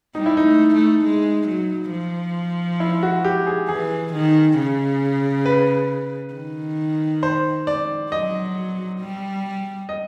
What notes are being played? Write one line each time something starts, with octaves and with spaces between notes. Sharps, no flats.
G3 D#4
E4
D#4
A3
A3
G#3
F#3
F3
E4
F#4
G4
G#4
E3 G#4
D#3
C#3
B4
D#3
C5
D5
F#3 D#5
G3
D#5